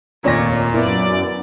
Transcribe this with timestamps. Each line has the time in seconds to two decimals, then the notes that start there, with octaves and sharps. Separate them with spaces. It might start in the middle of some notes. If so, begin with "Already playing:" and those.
0.24 F1 D#2 A#2 C#4 C#5 D5 A#6
0.74 F#2 B3 E4 A#4 D5